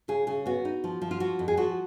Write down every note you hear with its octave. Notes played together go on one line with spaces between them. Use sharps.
C#3 G#4
C#3 G#4
B3 F#4
D#4
F3
F3
F4
F3 F#4
F2
G#4
F3 F#4